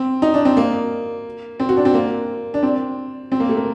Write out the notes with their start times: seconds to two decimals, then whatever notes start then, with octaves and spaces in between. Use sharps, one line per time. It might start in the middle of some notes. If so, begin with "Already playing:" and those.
Already playing: C4
0.22 D#4
0.34 D4
0.45 C4
0.57 A#3
1.60 C4
1.69 F#4
1.77 D4
1.85 C4
1.94 A#3
2.54 D4
2.63 C4
3.32 C4
3.40 A#3
3.49 A3
3.57 A#3